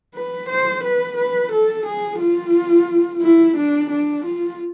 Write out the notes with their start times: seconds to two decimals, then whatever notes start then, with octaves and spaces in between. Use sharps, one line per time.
0.15 B4
0.49 C5
0.83 B4
1.17 B4
1.51 A4
1.86 G#4
2.19 F4
3.22 E4
3.57 D4
3.90 D4
4.25 F4